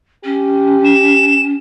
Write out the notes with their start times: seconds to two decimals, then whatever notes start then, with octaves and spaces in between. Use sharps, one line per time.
0.24 C#4 G4
0.84 E7